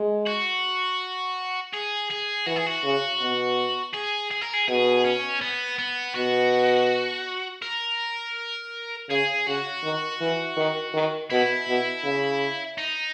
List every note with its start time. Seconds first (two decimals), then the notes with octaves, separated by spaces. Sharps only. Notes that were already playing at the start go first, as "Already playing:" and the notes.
Already playing: G#3
0.26 F#4
1.74 G#4
2.11 G#4
2.47 E3 F#4
2.56 G#4
2.67 F#4
2.84 C#3
3.21 B2
3.94 G#4
4.31 G#4
4.42 A#4
4.53 G#4
4.68 B2 G#4
5.04 C#4
5.41 B3
5.79 B3
6.15 B2 F#4
7.62 A#4
9.10 C#3 G#4
9.47 C#3 F#4
9.84 D#3
10.21 E3
10.57 D#3
10.94 D#3
11.30 B2 E4
11.68 B2
12.04 C#3
12.78 D#4